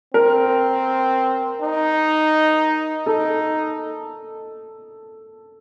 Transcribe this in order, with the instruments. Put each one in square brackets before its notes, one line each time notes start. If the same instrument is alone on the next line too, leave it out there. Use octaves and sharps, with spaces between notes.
[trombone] C4 [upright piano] A#4
[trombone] D#4
[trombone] D#4 [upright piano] A4